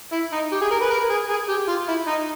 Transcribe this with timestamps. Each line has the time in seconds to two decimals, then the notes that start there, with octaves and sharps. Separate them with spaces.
0.12 E4
0.32 D#4
0.52 G4
0.61 G#4
0.71 A#4
0.81 B4
0.90 A#4
1.10 G#4
1.29 G#4
1.49 G4
1.68 F4
1.88 E4
2.07 D#4